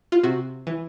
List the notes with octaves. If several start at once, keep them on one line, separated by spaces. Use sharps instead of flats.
F4
C3 F#4
E3